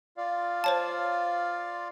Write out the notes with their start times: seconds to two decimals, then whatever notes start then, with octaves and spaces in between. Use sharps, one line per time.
0.17 F4 D5 F5
0.64 C5 C#5 A5